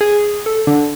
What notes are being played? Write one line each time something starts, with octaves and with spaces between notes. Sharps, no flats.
G#4
A4
D3